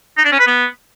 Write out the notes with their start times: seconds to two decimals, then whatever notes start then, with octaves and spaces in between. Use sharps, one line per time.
0.18 D#4
0.25 D4
0.32 C#4
0.40 B4
0.47 B3